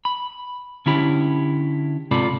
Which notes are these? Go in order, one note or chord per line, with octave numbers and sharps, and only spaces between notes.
B5
D3 C#4 E4 G4 B5
G#2 C3 F4 A4 D5 B5